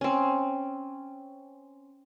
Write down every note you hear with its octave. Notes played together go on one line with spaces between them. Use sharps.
C4 C#4